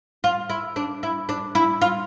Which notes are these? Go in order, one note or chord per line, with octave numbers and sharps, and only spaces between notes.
F4
E4
D4
E4
D4
E4
F4